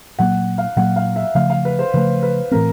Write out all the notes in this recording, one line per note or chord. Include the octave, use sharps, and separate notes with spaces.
A#2 F#3 A#3 F#5
F5
A#2 F#3 A#3 F#5
F5
E5
C#3 F3 A3 F5
F5
B4
C5
C#3 F3 A3 B4
B4
A2 E3 A3 C4 A#4